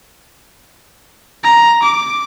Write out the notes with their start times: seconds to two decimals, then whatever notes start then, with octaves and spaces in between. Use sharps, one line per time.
1.43 A#5
1.82 D6